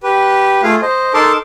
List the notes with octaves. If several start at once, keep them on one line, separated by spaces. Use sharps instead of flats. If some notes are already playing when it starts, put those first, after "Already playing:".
G4 B4
A3 F4 G#4 F5
C5 D#5
D#4 A4 A#4 A5 C6 D6